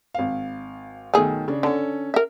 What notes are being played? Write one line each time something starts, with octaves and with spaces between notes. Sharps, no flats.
G#1 F5
B1 D#3 A3 G#4
C#3 D4
D3 C#4 A4
A#4 E5